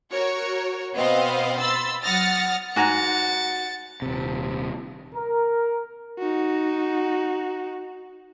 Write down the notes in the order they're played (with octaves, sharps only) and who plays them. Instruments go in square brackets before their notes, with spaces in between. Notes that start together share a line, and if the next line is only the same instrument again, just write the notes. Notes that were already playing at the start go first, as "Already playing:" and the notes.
[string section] F#4 A#4 C#5
B2 B3 C4 D#5 F5
B5 C6 E6 A6
F#3 F#5 D#6 F6 A6 A#6
[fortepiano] G#2 G#5 A#5 [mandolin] F#4 [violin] A6 C#7
[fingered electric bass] D#1 C3
[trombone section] A#4
[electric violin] D#4 F#4